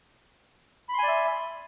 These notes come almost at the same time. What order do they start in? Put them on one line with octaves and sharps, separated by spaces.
B5 C6 G#5 D5 E5